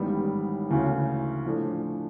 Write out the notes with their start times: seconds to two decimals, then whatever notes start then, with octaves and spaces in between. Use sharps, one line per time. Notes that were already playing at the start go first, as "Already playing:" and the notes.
Already playing: A1 G#2 D#3 G3 B3
0.69 D2 C#3 E3
1.45 A2 F3 A3 D4